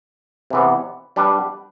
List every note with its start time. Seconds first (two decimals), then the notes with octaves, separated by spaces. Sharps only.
0.50 C3 E3 B3
1.16 G3 D4 G4 B4